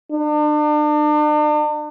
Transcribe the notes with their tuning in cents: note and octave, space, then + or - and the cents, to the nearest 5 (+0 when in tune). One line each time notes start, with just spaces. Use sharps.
D4 +40